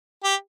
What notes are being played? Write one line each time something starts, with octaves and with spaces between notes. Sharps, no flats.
G4